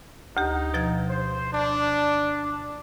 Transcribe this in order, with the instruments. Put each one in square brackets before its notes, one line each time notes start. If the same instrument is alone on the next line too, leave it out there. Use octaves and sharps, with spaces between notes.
[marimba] D2 G4 [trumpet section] D#4
[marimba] B2 F3 G#6
[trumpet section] C5
D4